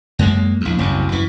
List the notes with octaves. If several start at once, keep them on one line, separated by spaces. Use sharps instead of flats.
F#2 G#3 A#3
A#1 E2
F#1 C2 F#2
F#2 E3